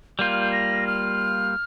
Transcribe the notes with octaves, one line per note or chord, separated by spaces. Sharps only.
G3 A#3 F4 G6
F6
G6
A#6
F6